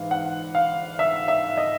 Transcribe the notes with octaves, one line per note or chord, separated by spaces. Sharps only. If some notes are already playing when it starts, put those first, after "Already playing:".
Already playing: G#2 E3 F5
F#5
F5
E5
E5
D#5